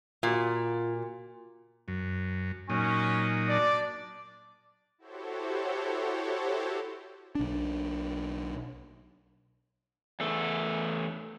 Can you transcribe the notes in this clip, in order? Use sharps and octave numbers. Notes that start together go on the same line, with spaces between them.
A#2 F4 F#4
F#2
A#2 F#3 C#4 D#4
D4 D5
E4 F#4 G4 A4 C5 C#5
B1 D4
E2 A3